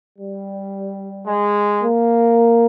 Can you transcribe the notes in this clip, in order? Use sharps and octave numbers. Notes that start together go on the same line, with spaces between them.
G3
G#3
A#3